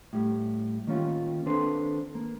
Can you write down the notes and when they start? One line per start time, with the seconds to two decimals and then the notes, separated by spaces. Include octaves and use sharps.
0.13 A2 G3
0.87 D#3 A#3 C#4 F4
1.46 D#3 C4 D4 A4 B4 C5
2.15 A#3